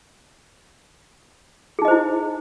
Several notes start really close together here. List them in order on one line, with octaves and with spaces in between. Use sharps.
G#4 D#4 D#5 C5 E4